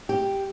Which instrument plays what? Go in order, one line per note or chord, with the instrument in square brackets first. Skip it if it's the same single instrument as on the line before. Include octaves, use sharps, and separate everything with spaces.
[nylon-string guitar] G4